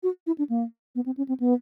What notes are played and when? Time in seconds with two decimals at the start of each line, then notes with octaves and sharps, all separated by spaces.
0.03 F#4
0.27 E4
0.38 D4
0.49 A#3
0.95 B3
1.06 C4
1.17 C#4
1.28 C4
1.40 B3